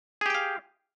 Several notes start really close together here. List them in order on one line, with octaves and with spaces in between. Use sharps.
G#4 G4 G5 F5